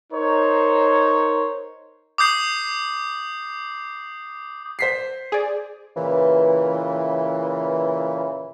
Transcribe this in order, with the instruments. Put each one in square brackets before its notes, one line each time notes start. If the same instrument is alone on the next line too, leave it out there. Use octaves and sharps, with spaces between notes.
[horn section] D#4 A#4 C5 C#5
[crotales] D6 D#6 G6 C7
[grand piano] C5 B6 C7
[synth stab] G#4 D5
[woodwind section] A#2 C#3 E3